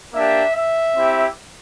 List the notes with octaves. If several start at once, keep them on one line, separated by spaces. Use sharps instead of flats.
A#3 D4 G4 E5
E5
C4 E4 G4